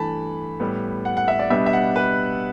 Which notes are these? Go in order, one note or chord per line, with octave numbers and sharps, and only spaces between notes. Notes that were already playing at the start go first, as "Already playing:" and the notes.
Already playing: G2 E3 A3 A5 B5
A2 G3 B3
F#5
F#5
E5
D5
B2 G3 B3 D4 E5
E5
F#5
B4